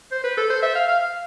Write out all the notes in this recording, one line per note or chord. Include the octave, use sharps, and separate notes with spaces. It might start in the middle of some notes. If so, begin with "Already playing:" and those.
C5
B4
A4
C5
E5
F5
F5